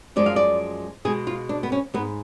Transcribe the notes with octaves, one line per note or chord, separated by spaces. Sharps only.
F#2 F3 G#3 D5
F5
D5
B2 G#3 G#4
F4
D4
B3
C#4
G#2 G#3 B3